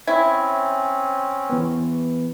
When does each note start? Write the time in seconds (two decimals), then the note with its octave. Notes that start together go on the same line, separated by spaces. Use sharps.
0.07 C4 C#4 E4 G#6
1.50 E3 B3